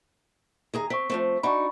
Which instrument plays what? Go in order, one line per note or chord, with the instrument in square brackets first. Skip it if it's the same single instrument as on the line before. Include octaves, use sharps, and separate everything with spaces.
[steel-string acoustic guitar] D#2 G#4 A#5
[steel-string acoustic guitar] C4 [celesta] C#6 B6
[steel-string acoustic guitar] F3 A3 C4
[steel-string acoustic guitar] D4 D#4 F#4 [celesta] B5 C#6